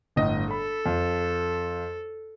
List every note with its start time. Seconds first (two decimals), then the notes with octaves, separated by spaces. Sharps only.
0.16 G1 A2 D#5
0.51 A4 B5
0.86 F2